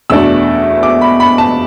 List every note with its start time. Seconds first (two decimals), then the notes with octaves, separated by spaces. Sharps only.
0.10 E2 B2 A3 D4 E6
0.83 D6
1.01 B5
1.20 B5
1.38 A5